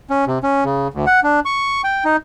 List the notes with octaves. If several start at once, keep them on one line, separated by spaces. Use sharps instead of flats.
C#4
C3
C#4
C#3
D2
F#5
D4
C#6
G5
D#4